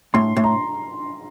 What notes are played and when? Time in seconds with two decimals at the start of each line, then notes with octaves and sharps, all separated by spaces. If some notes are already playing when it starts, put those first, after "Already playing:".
0.14 A2 C6
0.37 A2
0.44 A#5